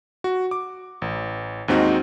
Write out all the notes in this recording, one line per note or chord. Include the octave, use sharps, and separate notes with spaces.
F#4
D6
A1
D#2 G#2 C4 D#4 F#4